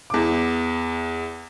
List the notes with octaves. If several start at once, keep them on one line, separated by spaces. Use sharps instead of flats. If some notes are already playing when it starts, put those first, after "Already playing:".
E2 D6